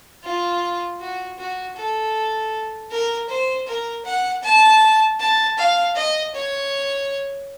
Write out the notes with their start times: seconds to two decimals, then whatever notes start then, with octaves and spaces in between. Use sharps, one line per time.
0.24 F4
1.00 F#4
1.38 F#4
1.77 A4
2.91 A#4
3.29 C5
3.67 A#4
4.05 F#5
4.43 A5
5.20 A5
5.58 F5
5.96 D#5
6.34 C#5